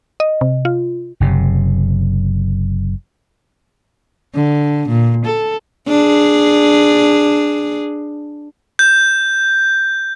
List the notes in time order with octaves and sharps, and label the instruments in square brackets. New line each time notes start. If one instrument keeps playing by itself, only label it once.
[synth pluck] D#5
C3
F4
[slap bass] F#1 C3
[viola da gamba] D3
A#2
A4
D4 G#4
[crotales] G6